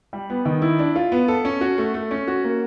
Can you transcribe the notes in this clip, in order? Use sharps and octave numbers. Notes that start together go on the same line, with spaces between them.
G3
B3
D#3
E4
D4
F4
B3
A4
C#4
F#4
A3
A3
C#4
F#4
A#3